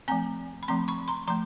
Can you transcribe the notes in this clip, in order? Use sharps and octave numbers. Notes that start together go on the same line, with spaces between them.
F3 A3 C4 G#5 A#5
B5
F3 A3 C4 A#5 C6
B5 C#6
A#5 C6
F3 A3 A#5 C6